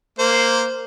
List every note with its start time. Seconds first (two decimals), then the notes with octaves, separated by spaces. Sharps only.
0.19 A#3 C5